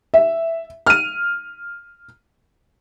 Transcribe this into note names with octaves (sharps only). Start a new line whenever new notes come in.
E5
F6 D#7